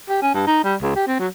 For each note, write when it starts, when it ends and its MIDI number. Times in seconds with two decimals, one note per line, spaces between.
0.09 0.19 67
0.22 0.34 61
0.34 0.42 43
0.47 0.62 63
0.64 0.75 55
0.82 0.93 37
0.95 1.07 67
1.07 1.18 60
1.19 1.27 54